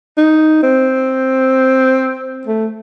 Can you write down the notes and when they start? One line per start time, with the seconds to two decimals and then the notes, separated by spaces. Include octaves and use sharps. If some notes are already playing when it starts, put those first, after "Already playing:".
0.17 D#4
0.63 C4
2.47 A3